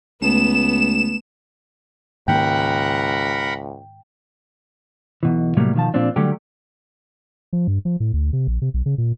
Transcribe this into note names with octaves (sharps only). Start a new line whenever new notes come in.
C#2 A3 B3 E7
C#2 G#2 D#3 A#3 A#4 F#5 G5 B5
B1 B2 E3
A2 C3 F#3 G3 A#3
B2 D#3 F3 A5
A#2 F3 C4 D4
D3 F#3 G3 A3 G4
F3
G2
F3
A2
D2
C3
A#1
C3
B1
C#3
A#2